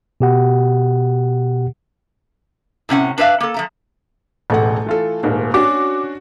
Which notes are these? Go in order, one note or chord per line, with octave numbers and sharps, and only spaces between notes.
B2 G4 F#5
A2 C3 C#4 F#5
D4 B4 C5 E5 F5
A#3 A4
F3 A3 A#5
E1 A1 A3 F#5
E3 F4 A4
D#1 G#2 A#3
C#4 D4 F#4 D6